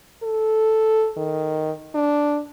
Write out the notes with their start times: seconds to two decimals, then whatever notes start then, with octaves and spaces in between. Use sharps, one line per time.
0.23 A4
1.17 D#3
1.95 D4